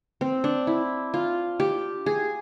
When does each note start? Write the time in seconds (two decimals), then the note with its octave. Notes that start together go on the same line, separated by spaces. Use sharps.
0.21 C4
0.44 D4
0.67 E4
1.14 F4
1.60 G4
2.06 G#4